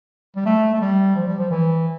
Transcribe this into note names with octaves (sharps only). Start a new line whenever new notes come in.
G3
A3
A3
G3
F3
G3
F3
E3